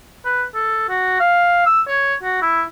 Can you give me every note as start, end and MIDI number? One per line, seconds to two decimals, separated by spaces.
0.25 0.43 71
0.54 0.86 69
0.89 1.15 66
1.20 1.64 77
1.66 1.82 88
1.87 2.14 73
2.23 2.41 66
2.42 2.63 64